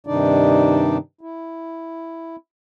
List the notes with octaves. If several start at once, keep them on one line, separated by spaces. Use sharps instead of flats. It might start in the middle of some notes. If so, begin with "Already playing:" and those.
G2 C3 D#3 D4 D#4 D5
E4